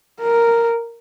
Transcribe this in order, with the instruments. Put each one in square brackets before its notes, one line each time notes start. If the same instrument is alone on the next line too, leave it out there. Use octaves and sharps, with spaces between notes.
[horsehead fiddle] A#4